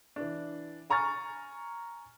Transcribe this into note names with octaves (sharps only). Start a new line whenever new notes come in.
E3 D4
G#5 A#5 C#6 F6 A6